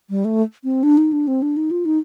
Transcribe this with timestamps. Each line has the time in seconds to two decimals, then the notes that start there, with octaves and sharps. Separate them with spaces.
0.10 G3
0.25 A3
0.64 C4
0.83 D4
0.97 D#4
1.12 D4
1.27 C4
1.42 D4
1.57 D#4
1.71 F4
1.85 D#4